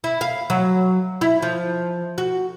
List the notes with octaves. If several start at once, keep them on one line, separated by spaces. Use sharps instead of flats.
E4
F5
F#3
E4
F3
F#4